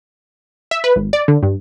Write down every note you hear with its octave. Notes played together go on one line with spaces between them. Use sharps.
E5
B4
G#1
D5
D3
G2